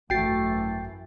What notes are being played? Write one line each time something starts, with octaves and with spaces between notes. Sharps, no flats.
G#1 F#2 E3 A3 F#4 G5 A6 C7